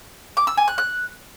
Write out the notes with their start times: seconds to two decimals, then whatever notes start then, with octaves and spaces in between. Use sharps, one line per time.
0.37 D6
0.47 E6
0.57 G#5
0.68 F#6
0.78 F#6